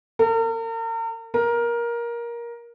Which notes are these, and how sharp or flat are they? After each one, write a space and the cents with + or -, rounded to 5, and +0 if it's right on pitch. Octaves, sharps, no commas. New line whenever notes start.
A#4 -40
A#4 +15